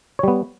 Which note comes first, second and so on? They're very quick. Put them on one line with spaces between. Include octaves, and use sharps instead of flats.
C#5 G3 B3